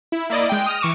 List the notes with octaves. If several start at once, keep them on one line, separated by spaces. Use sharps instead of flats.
E4
A#3 E4 D5 D#5
G#3 G5
D#6 F6 A#6
E3 C#6 D6 D#7 E7